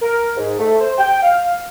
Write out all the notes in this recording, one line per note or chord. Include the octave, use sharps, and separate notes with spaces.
A#4
G#2
A3
C5
G5
F5